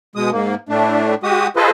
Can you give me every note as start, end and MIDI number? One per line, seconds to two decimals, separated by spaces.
0.16 0.30 47
0.16 0.30 56
0.16 0.30 87
0.32 0.55 44
0.32 0.55 58
0.69 1.14 45
0.69 1.14 57
0.69 1.14 62
1.23 1.47 56
1.23 1.47 66
1.23 1.47 67
1.23 1.47 87
1.56 1.70 65
1.56 1.70 68
1.56 1.70 69
1.56 1.70 71
1.56 1.70 72
1.56 1.70 75